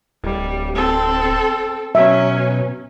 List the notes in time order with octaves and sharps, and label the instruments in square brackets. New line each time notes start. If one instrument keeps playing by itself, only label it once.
[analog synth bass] D1 [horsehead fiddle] G3
[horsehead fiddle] C4 A4
[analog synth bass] B2 [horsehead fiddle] F#3 C#4 [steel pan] E5